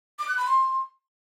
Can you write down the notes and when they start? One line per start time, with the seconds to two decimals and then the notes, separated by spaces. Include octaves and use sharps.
0.19 D6
0.28 F#6
0.37 B5
0.47 C6